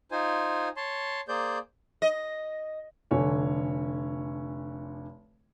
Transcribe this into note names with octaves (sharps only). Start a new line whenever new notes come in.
D#4 F4 C5 G#5
C#5 A5 C6
A#3 G#4 C5 D5 G6
D#5
F1 D3 C#5 G#5